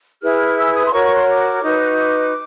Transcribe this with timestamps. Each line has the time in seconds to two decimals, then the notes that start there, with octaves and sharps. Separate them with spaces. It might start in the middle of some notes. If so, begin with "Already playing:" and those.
0.21 E4 G#4 B4 F6
0.57 E6
0.74 D#6
0.87 C6
0.92 F#4 A#4 C#5 C#6
1.04 C#6
1.15 C6
1.28 D6
1.63 D#4 F#4 B4
1.97 D6